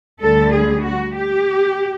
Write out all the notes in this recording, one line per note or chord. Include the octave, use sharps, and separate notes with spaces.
D2 D3 G3 A4
G#4
F#4
G4